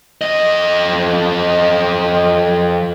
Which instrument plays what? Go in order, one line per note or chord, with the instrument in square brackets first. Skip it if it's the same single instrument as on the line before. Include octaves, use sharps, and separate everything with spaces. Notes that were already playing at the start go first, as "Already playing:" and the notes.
[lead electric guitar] F2 D#5